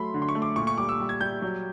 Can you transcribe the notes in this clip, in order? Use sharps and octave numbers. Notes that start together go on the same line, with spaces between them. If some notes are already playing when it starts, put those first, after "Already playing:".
Already playing: F#3 A3 B5 C6
D3
C6
C#6
A3
D6
A#2 C#6
C#6
G3 D6
E6
G3
G#6
G3 G6
F#3